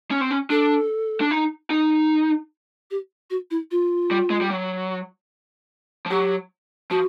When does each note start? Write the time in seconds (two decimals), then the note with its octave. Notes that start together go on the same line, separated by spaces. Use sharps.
0.11 C#4
0.21 C4
0.31 C#4
0.50 D4 A4
1.21 D4
1.31 D#4
1.70 D#4
2.91 G4
3.30 F#4
3.51 E4
3.71 F4
4.11 G3
4.30 G#3
4.41 G3
4.50 F#3
6.06 F3
6.10 F#3 G4
6.90 F3 F#4